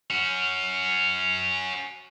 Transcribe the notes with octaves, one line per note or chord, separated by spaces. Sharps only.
C#4 F#4